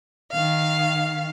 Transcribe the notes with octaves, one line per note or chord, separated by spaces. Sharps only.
D#3 F5